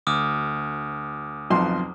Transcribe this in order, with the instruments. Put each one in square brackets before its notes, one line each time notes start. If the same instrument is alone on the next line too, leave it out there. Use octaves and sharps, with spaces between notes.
[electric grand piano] D2 [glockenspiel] D6 D#6 F6
[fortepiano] B1 F2 C6